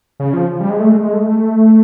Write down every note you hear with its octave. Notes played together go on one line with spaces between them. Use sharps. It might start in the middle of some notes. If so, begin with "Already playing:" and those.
C#3
F3
G3
G#3
A3
G#3
G#3
A3
A3